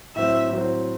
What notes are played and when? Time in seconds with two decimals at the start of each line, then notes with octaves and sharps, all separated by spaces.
0.16 A2 F#3 C4 E5
0.49 A2 F#3 C4